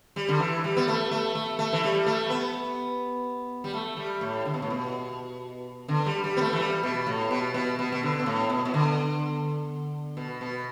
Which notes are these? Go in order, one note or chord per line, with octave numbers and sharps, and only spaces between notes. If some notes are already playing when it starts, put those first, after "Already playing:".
G3
D3
E3
G3
B3
A3
A3
A3
A3
E3
G3
A3
B3
G3
A3
G3
A2
D3
B2
A2
B2
D3
G3
G3
B3
A3
E3
G3
B2
A2
B2
B2
B2
B2
D3
B2
A2
B2
B2
D3
B2
B2